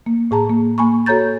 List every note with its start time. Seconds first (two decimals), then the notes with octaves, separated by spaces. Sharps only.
0.06 A#3
0.31 A2 G#4 A5 A#5
0.49 A#3
0.78 A#3 G#5 B5 C#6
1.06 F#4 A4 C#5 A#5 G6 A6